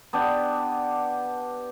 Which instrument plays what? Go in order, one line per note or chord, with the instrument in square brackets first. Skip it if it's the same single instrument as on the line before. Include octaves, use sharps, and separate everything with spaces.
[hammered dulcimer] B3 D4 G4